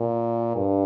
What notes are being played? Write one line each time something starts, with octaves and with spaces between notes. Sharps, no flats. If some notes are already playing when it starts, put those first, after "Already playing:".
Already playing: A#2
G2